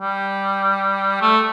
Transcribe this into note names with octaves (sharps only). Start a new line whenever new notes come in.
G3
A3